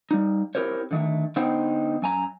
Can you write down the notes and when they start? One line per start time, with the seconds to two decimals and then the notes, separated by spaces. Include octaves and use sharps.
0.11 G3 D#4
0.55 C4 E4 G4 A#4 C5 C#5
0.91 D3 D#3 A3
1.36 D3 B3 D#4 C5 F#5 G5
2.02 F#2 G#5 A#5